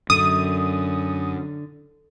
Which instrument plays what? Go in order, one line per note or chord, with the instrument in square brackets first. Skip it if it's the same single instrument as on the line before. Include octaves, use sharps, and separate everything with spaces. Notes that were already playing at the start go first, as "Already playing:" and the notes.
[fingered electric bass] F#2 [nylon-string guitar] D3 [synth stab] D#6